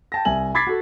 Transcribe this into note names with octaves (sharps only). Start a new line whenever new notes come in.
G5 A5 A#6
C2 E5 G#5 F#7
B5 D6 G#6 A6 B6 C7
F#4 A4